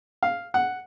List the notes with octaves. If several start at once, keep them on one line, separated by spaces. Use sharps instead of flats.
F5
F#5